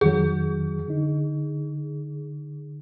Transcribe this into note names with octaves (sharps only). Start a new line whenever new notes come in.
F2 D#3 F#3 G#4
D3 D#4